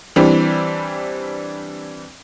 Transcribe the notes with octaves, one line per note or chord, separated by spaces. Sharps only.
E3 G3 C4 D4